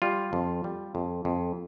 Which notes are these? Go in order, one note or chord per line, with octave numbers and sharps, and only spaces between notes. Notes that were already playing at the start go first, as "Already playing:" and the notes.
G3 F4
F2
G3
F2
F2